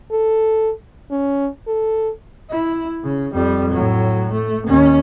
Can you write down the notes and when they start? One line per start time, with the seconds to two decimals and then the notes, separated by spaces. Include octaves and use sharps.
0.11 A4
1.11 C#4
1.67 A4
2.50 E4
3.04 C#3
3.33 F2 G3
3.71 A2 F#3
4.32 A3
4.67 D#2 C#4